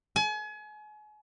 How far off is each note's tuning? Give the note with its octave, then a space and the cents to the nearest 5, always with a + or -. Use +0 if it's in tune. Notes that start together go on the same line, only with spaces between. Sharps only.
G#5 +35